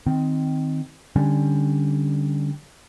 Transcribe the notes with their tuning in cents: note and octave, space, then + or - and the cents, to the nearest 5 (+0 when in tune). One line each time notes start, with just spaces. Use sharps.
D#3 +0 C4 -10
D3 +0 G3 +10 C#4 +0